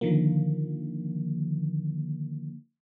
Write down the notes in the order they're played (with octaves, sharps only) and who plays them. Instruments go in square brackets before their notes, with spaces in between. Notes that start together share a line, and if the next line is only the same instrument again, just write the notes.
[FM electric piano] D3 D#3 F3 A#3